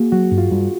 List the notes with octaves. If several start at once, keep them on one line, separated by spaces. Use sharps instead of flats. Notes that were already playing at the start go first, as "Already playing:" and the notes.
Already playing: A#3 F#4 G#4
F#3 F#4
G2
F4
G2